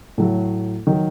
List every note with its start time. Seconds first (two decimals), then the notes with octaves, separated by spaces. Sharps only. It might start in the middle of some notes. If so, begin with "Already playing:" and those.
0.18 A2 F#3 A3 A4
0.87 D#3 F#3